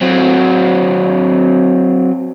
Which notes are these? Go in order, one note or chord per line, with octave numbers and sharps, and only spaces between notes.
F#3 C4